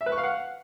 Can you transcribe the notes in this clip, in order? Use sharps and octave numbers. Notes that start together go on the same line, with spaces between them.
E5
B4
C#6
F5
F#5